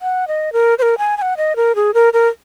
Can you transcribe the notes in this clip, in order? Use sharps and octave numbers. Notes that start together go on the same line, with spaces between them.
F#5
D#5
A#4
C5
A#4
G#5
G#5
F#5
D#5
A#4
G#4
A#4
A#4